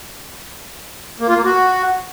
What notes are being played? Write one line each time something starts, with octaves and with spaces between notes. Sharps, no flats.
A#3
F4
A#3
F#4